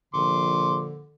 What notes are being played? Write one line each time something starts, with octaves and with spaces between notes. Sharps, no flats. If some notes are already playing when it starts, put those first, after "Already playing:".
A#1 D3 C6 D6